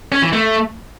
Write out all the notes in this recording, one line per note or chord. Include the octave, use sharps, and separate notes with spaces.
C#4
E3
A3